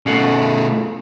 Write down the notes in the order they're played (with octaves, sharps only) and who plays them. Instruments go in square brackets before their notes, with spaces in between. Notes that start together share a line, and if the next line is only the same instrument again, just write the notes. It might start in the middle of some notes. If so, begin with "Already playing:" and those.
[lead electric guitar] B2 A3 [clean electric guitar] C#4 F5 F#5